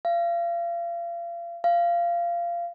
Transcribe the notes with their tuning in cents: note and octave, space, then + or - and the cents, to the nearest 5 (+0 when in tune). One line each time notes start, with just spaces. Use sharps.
F5 -35
F5 -20